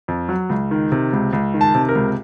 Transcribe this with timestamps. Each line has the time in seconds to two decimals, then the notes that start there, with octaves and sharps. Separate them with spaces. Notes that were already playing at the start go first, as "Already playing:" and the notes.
0.08 F2
0.29 F#3
0.49 C#2
0.71 D#3
0.92 C3
1.13 C#2
1.33 C#2
1.54 D#3
1.61 A5
1.75 C3
1.89 A#4
1.95 C#2